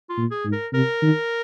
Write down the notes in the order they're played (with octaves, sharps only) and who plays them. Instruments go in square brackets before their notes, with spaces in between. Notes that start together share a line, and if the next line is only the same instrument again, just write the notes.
[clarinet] F4
[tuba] A#2
[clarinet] G#4
[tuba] G#2
[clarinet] A#4
[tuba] C3 [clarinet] A#4
[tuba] D#3